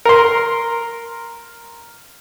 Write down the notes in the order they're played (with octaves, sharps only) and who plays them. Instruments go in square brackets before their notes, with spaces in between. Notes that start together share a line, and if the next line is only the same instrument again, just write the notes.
[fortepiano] A#4 C6